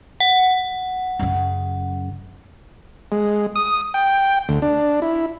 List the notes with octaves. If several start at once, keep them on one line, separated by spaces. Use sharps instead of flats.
F#5
F#2 C#3
G#3
D#6
G5
D2
D4
E4